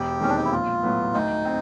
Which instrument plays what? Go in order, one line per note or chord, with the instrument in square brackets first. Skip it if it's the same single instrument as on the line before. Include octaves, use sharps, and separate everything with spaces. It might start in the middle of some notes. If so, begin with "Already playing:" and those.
Already playing: [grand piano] E1 [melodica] G4
[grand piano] D#2 D#3 G#3 C4 [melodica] C#4
[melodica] D4
D#4
E4
[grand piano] A#1 [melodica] F4
[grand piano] A2 F#3 B3
[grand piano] D2 [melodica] D#4
[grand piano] C4